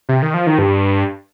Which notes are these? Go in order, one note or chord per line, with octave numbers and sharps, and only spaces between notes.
C3
D#3
F3
D#3
G2